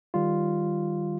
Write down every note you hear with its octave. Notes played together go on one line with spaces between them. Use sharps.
D#3 G3 F4